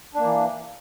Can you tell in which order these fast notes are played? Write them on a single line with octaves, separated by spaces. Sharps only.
D4 A#3 E3